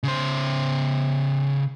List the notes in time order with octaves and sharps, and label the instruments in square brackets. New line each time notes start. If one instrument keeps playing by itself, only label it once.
[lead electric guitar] C#3 C5